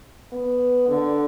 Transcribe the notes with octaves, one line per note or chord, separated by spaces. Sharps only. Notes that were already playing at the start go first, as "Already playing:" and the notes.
B3
D3